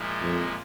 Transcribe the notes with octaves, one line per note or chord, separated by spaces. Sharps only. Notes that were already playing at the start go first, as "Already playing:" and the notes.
Already playing: A#2 F3 G#3 E4
F2